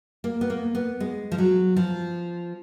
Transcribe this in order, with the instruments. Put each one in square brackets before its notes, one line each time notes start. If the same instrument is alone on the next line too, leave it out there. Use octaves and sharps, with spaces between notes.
[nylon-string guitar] A#3
B3
A#3
B3
G#3
F3
F#3
F3